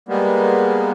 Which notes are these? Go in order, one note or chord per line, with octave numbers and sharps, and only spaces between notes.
G3 G#3 A#3 B3